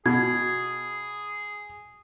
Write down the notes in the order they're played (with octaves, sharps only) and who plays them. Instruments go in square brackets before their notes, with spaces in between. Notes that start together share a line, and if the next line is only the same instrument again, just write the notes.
[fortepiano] B2 [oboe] G#4 [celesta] G#6